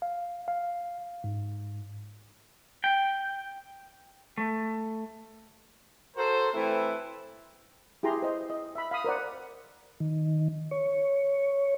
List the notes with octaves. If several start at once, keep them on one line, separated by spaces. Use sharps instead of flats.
F5
F5
G#2
G5
A3
F#4 A4 A#4 C5
E3 A3 C4 E4
E4 G4 G#4 A#5 C6
C5 D#5
D#5
E5 B5
F5 B5 D#6
A#4 C5 D5 F#5
D#3
C#5